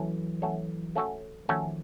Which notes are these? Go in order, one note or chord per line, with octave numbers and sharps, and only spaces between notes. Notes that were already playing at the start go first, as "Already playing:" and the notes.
Already playing: E3 F#3 A3 C#4 A4 C#5
A3 C#4 F#4 A4 C#5
A3 C#4 F#4 A4 C#5
D#3 F3 A3 C#4 F#4 A4 C#5